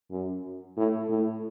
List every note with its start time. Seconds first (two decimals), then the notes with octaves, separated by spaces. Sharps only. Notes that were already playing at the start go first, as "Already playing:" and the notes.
0.11 F#2
0.77 A2
1.10 A2